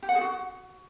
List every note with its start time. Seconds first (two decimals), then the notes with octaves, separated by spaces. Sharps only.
0.03 G4
0.09 F#5
0.15 G#4
0.21 F#4